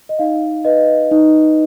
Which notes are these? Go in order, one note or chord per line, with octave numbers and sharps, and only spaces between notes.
D#5
D#4 F5
B4 D#5
D#4